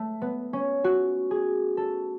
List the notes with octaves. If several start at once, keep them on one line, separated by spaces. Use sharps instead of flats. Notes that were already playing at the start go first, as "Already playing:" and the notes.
Already playing: A3
B3
C#4
F#4
G#4
A4